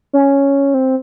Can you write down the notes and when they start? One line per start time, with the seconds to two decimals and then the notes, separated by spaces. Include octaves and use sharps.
0.13 C#4
0.74 C4